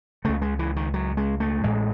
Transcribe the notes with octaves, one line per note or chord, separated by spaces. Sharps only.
C#2 C#3 A3
G#3
E3
D#3
F#3
G#3
A3
A1 A2 G#3